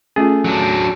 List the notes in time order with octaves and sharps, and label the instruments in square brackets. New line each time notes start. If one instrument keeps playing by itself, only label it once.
[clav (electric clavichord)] A3 G#4 [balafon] C#4 F4
[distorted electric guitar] F#3 D4